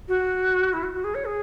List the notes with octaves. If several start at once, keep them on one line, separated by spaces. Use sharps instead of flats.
F#4
E4
F#4
F#4
G#4
C#5
G#4